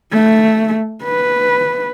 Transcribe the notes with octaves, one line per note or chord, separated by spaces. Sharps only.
A3
B4